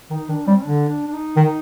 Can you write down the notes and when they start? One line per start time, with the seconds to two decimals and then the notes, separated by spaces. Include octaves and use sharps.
0.10 D#3 D#4
0.28 D#3 D4
0.47 G3 C4
0.64 D3 D4
0.89 D4
1.08 D4
1.13 D#4
1.37 D#3